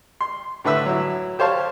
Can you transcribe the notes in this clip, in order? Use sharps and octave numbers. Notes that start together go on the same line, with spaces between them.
C6
A2 D3 B4 E5 E6
F#3 E4
G4 C5 C#5 F5 A5